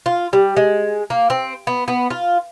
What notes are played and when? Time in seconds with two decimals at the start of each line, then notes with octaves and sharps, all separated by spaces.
0.06 F4
0.33 G3
0.57 G#3
1.10 A#3
1.30 C4
1.67 B3
1.88 B3
2.10 F4